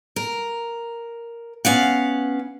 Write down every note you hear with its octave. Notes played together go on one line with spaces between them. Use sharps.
A#4
B3 C#4 F5 F#5